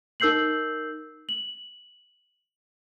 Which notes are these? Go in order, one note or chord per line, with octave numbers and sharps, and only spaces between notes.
D#4 A#4 E6 G6 C7 F#7
F#7